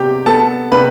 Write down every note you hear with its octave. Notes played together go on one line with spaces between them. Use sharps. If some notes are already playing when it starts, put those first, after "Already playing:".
Already playing: C3 B3 G4 G5
B3 A4 A5
C3 B4 B5